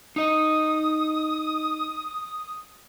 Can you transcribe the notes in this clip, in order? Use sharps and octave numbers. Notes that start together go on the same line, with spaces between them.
D#4 D#5 D#6